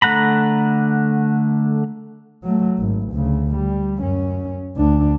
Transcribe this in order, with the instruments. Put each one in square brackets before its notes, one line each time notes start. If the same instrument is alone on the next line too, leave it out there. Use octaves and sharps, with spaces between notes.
[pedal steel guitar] D3 A3 F#5 A#5 B5
[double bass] F#3 A3
G#1
D2 C#3
G3
F#2 C#4
D2 D4